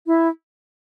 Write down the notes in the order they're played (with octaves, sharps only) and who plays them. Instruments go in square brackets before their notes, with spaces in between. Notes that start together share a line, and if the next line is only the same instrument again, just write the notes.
[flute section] E4